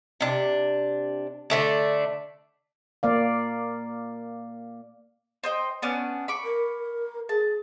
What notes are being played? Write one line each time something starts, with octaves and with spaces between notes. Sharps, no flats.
C3 D4
D3 A3 D4
A#3 D5 F5
C5 D#5 G5
B3 C#4 D4
B5 C#6 D6
A#4
G#4 A5